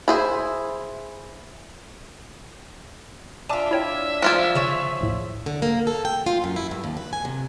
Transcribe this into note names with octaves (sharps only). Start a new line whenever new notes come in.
E4 G#4 C5
D4 F4 E5 G#5 A5 D6
E4 C#5 G5
F3 F4 D5 F#6 G#6
G1 C#3 G#4 C5 C#5 E7
A#1 D#2 A2
D3
A#3
A4
G5
F4
F#2
E4
G2
D#2
B4
G#5
C3